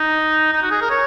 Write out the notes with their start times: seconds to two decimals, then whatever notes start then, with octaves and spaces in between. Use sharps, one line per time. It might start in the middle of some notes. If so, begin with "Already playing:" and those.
Already playing: D#4
0.53 D#4
0.63 F#4
0.71 G#4
0.81 A#4
0.90 C#5